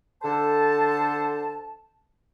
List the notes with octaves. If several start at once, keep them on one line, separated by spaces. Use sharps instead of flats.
D3 A4 C5 A5